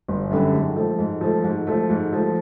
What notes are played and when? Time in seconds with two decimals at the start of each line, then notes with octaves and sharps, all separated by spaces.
0.08 G1
0.30 F#2 D3 G3
0.53 G#2
0.76 F3 A3
0.99 G#2
1.21 F3 A3
1.44 G#2
1.67 F3 A3
1.90 G#2
2.12 F3 A3